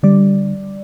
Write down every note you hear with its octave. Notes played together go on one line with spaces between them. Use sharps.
D3 G3 D5